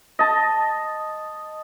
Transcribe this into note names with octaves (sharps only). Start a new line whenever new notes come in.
D#5 A5